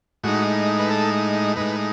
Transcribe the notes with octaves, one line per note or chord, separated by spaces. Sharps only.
A2 G#3 D#4 F#4
B4
A4
A2 G#3 D#4 B4